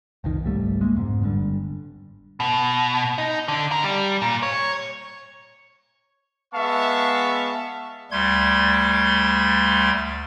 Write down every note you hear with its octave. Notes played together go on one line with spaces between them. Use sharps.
F1 C2 D#3
G#1 C#2 G3 A3
G#3 A#3
F1 G#2 C3
G1 G2 D3
B2
D#4
D3
A#4
G3
A#2
C#5
G#3 B3 E5 F5 A5 C#6
D2 G3 A3 C6 G#6